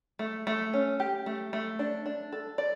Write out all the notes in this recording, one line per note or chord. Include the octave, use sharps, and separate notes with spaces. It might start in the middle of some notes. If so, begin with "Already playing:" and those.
A3
A3
C#4
G4
A3
A3
D4
D4
A4
D5